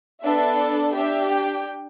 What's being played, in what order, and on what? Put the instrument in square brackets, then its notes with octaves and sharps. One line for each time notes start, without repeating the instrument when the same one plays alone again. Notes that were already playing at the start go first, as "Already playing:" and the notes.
[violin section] B3 D4 A4 E5
D5
D4 G4 E5
G5